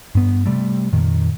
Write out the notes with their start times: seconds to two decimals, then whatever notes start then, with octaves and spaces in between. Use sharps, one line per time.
0.15 G2 B3
0.46 C3 G3 A3
0.92 F2 A#2 D#3